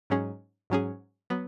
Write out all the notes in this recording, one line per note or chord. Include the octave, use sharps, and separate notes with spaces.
G#2 F#3 C#4 G#4
G#2 F#3 C#4 G#4
F#3 B3